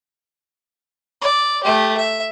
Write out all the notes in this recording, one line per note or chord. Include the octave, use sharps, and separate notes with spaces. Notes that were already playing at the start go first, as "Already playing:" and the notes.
D5
A3 G4
E5